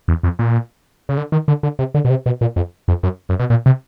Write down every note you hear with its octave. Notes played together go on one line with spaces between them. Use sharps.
E2
F2
A#2
C#3
D3
D#3
D3
D3
C3
D3
B2
C3
B2
A#2
F2
F2
F#2
F#2
B2
A#2
C3